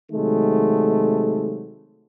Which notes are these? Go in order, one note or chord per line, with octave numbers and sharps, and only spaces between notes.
C3 D#3 F#3 G#3 A3